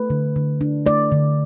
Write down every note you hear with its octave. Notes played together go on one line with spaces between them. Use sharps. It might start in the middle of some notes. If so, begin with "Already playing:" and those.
Already playing: A3 B4
D3
D3
D4
A3 D5
D3